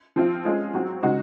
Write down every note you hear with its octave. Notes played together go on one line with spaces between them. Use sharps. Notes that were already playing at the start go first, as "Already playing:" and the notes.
F3 C4 F4
G#3 C#4 F4 G#4
F#3 C4 F#4
C#3 G#3 D#4 F#4